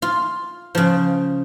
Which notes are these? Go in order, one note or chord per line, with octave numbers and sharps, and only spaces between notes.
F4
C#3 F3